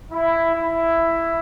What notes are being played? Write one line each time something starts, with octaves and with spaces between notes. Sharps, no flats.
E4
E4